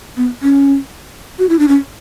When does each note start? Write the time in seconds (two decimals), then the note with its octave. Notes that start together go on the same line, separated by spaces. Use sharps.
0.17 B3
0.42 C#4
1.39 F#4
1.49 E4
1.59 D4
1.68 C#4